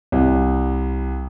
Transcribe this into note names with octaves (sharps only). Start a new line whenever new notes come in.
C2